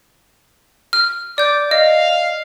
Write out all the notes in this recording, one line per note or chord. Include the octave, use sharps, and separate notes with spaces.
F6
D5 D6 G6
D#5 F5